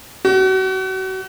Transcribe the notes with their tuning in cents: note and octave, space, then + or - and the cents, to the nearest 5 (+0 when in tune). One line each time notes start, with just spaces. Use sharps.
F#4 +35